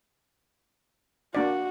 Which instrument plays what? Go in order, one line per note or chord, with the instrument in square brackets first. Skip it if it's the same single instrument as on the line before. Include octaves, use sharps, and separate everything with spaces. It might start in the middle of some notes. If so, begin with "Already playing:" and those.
[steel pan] A#3 D4 D5 [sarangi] F#4